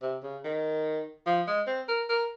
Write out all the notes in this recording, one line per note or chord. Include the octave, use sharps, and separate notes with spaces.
C3
C#3
D#3
F3
G#3
C4
A#4
A#4